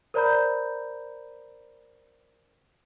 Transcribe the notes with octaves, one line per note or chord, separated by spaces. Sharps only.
A#4 C5 D5 A#5 B5 G6